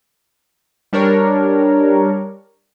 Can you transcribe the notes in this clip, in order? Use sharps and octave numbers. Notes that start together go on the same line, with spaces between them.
G3 D4 A#4 C#5